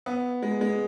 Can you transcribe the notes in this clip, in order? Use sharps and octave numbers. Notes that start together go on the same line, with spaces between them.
B3
G#3
G#3